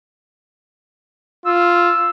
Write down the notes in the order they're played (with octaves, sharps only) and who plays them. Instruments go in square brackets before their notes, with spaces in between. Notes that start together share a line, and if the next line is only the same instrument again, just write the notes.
[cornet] F4 [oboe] E6